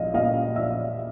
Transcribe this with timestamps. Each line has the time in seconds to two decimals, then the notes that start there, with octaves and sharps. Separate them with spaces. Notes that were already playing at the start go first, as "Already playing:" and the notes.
Already playing: A#1 D#5 F5
0.14 A#2 D#5 F5
0.56 A#1 D5 E5